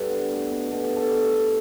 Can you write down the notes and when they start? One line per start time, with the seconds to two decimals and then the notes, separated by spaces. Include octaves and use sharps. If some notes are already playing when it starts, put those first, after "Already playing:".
Already playing: G2 D3 E4 G4 A4 B4 D5
0.10 B3
0.30 A3
0.51 B2
0.71 B2 A4
0.84 G4
0.92 A3 A4
1.12 A3
1.33 A3